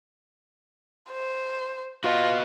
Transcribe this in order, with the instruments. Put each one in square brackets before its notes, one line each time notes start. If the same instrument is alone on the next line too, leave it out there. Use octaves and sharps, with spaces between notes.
[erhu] C5
[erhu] F4 [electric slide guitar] F#4 B4 D#5